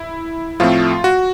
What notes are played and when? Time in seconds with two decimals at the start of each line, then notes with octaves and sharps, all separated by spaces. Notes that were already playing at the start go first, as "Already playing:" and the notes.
Already playing: E4
0.60 A2 F3 A3 C4 F4
1.04 F#4